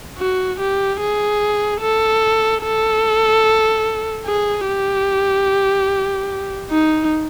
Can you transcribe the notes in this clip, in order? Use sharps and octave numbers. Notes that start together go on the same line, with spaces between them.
F#4
G4
G#4
A4
A4
G#4
G4
D#4